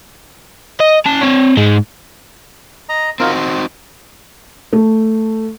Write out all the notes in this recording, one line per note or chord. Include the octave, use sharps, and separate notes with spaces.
D#5
C#4 A5
C4 C#5
G#2 G#3
D#5 A#5
C4 D#4 F4 F#4 A#4
C6
A3